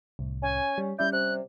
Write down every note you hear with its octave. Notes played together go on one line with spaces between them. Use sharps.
C2 A2
C#4 G#5
G3
G3 C#4 E4 D5 G6
C3 F#6